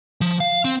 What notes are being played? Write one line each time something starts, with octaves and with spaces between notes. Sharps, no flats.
F3
F5
C4